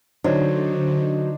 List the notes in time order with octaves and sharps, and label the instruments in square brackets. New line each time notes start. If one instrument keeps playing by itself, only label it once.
[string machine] D3 [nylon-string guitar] F#3 [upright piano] D4 D#4 C5